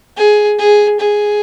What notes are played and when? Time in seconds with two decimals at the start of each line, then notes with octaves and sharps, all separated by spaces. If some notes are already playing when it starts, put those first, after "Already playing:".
0.17 G#4
0.59 G#4
1.00 G#4